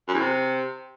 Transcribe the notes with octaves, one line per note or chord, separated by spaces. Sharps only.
F#2
E2
C3